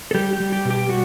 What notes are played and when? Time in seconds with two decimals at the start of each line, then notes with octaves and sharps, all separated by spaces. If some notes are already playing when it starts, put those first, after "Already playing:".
0.11 A4
0.15 G3 G4
0.33 G4
0.40 G3
0.52 G4
0.65 B2
0.70 G4
0.89 G3 F#4